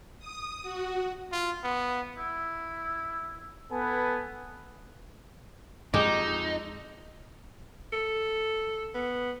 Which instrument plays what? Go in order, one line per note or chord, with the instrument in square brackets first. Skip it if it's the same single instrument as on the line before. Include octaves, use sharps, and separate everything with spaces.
[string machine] D#6
F#4
[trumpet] F4
B3
[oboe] E4
[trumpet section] B3 A4 B4 G#5
[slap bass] F2 [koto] G#3 [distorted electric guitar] D#4 [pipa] G4
[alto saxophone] A4
B3